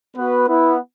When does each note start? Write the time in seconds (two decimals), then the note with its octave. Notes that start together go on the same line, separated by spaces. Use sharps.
0.17 B3 F#4 B4
0.47 B3 E4